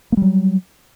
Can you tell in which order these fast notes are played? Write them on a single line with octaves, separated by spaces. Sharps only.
A#3 G3 F#3